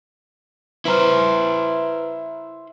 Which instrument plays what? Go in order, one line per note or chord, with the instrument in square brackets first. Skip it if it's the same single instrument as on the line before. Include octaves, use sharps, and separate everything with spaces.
[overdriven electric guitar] E4 C5 [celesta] B4 A#5 F6